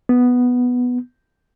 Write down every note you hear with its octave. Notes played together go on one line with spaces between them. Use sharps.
B3